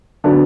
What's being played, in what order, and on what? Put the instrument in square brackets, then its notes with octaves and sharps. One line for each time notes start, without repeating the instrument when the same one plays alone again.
[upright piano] D3 F#3 B3 D4